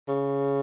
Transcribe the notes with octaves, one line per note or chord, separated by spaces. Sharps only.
C#3